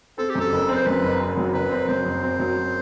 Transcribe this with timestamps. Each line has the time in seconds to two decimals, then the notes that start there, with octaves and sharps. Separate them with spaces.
0.18 C4 A4
0.29 G4
0.35 F#2 A4
0.52 F#1
0.69 C4
0.74 C5
0.86 F#2 B4
1.03 F#1
1.20 C4
1.37 F#3
1.54 F#1 B4
1.71 C4
1.88 F#2 C5
2.05 F#1
2.23 C4
2.39 F#3